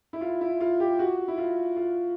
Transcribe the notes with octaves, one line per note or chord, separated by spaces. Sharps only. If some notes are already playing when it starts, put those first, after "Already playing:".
E4
F4
E4
F4
G4
F#4
E4
F4
F4